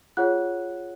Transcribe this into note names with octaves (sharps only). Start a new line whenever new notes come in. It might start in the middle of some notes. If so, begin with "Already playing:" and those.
F4 G#4 C#5 F#5 F#6